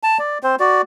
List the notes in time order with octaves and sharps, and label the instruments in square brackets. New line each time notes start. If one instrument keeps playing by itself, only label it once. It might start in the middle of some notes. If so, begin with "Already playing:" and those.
[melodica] A5
D5
C4 C5
F#4 D5